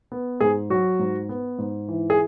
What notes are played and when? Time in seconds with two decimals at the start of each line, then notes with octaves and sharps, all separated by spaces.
0.12 B3
0.40 G#2 G#4
0.70 F#3 F#4
0.99 G#2
1.29 B3
1.58 G#2
1.88 E3
2.10 G#4